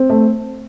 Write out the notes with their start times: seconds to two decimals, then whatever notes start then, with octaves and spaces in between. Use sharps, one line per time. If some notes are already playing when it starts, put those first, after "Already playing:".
Already playing: C4
0.10 A3